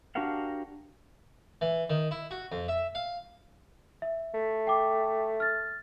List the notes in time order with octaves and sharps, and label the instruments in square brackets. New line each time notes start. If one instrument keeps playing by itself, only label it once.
[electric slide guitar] D4 F#4 G4 A#4 F5 F#5
[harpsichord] E3
D#3
E4
F#4
F2
E5
F5
[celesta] E5
[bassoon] A3
[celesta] G5 D6
F6 A6